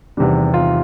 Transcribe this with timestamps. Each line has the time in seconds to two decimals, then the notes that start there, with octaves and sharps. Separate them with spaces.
0.17 E2 C3 D#3 G3 D4
0.54 F4